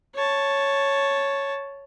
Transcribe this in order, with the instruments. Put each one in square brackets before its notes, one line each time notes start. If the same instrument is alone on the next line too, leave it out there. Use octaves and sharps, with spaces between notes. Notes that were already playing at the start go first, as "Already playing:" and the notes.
[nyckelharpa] C#5 A5